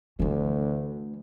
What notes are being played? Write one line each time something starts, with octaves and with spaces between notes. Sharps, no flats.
D2 E3 A3